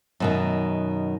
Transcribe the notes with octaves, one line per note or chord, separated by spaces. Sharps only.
F#2 B2 D#3